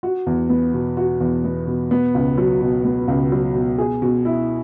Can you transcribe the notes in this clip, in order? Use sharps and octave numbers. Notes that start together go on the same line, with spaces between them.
F#4
E2
B3
B2
F#4
E2
B3
B2
B3
C#2
F#3
B2
B3
C#2
F#3
B2
G#4
B2
E4